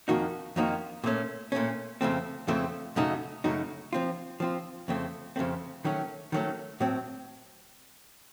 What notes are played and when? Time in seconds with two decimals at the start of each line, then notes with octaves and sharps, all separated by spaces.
0.08 F2 D#3 A#3 D#4 F#4
0.56 F2 D#3 A#3 D#4 F#4
1.04 A#2 A3 C#4
1.52 A#2 A3 C#4
2.01 F2 C#3 A3 C4
2.48 F2 C#3 A3 C4
2.96 F#2 C#3 A3 D#4 F#4
3.44 F#2 C#3 A3 D#4 F#4
3.93 F3 C4 F4
4.40 F3 C4 F4
4.88 F2 C#3 A3 C4
5.36 F2 C#3 A3 C4
5.85 D#3 F#3 A3 C#4
6.32 D#3 F#3 A3 C#4
6.80 A2 F#3 C4